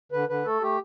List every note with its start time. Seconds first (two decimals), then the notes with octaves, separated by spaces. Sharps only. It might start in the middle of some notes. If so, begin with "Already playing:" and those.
0.12 D3 B4
0.28 D3 B4
0.45 A3 A4
0.62 A3 G4